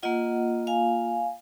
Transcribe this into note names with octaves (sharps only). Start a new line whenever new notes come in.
A#3 F4 D#5 F#5
F5 G#5